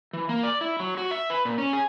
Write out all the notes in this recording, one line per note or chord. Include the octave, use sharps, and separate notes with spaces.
E3
A#3
D5
E4
F#3
F#4
E5
B4
A#2
C#4
G#4